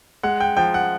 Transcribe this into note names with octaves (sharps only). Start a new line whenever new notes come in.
G#3 F#5
G5
F3 G5
F#5